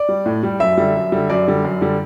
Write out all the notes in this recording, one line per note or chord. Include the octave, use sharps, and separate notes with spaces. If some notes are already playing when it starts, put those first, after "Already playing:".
Already playing: D5
G3
A2
G3
F#2 E5
D3 G3
F#2
D3 G3
F#2 D5
D3 G3
F#2
D3 G3